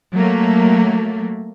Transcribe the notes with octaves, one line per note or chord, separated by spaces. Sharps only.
F#3 A3 A#3